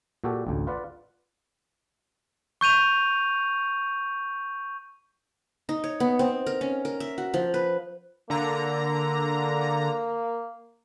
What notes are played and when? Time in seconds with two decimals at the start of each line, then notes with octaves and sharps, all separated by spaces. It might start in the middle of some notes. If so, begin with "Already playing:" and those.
0.24 A#2 F#4 G4 A4
0.47 A1 D2
0.67 F4 B4 D5 F#5
2.61 C#6 G6 D#7 F7
5.69 D#4
5.84 C#5
6.00 B3
6.19 C4
6.46 A#4
6.61 C#4
6.85 A#4
7.00 E5
7.18 F#4
7.34 F3
7.54 B4
8.30 D3 A#3 A#5